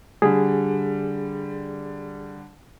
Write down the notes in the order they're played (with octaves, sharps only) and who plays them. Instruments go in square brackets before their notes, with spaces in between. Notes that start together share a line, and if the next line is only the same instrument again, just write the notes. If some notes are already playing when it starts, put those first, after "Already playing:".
[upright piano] D3 G3 [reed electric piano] G#4